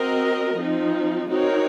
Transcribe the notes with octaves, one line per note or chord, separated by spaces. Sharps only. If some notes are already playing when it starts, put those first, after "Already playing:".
Already playing: C4 F#4 A#4 D#5
F3 C4 D#4
C4 D#4 F#4 A#4 C#5